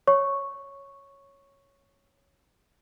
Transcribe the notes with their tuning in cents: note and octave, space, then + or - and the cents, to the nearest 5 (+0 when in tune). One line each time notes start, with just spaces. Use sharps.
C#5 +0 C#6 +0